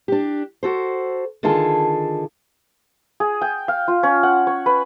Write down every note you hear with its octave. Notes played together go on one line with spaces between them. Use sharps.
D4 G4
F#4 A4 C5
D3 D#3 F4 G#4 A4 A5
G#4
G5
F5
F4
C#4
F#5
C#5
B4